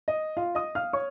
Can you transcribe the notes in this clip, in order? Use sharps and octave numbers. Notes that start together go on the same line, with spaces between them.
D#5
F4 F5
D#5 D#6
F5 F6
C#5 C#6